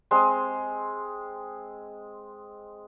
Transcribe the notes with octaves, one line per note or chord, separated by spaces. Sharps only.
G#3 C4 C6